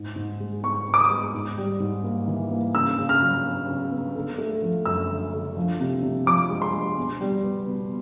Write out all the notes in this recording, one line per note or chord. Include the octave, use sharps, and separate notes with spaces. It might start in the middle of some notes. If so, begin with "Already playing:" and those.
Already playing: G#2
G#2
G#3
B3 C#6
B3
D6
D#6
G#3
G#2
G3
G#2
A#3
E3
A#3
C#3 E6
C#3
F6
F#3
B3
C#3
B3
D3
A3
F3
F#2 E6
D3
D3
F3
C3
C3
F3 D6
G#3
C6
G#3
B2
G3
B3
B2